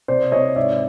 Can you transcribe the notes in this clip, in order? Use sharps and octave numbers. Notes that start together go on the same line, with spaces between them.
C3 C5 D5
C3 C#5 D#5
G#2 D5 E5